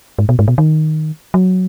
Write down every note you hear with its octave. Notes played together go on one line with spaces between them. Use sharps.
G#2
B2
G#2
B2
D#3
F#3